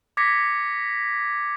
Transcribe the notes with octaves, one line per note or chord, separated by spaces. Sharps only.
D6 G#6 A#6 B6 C#7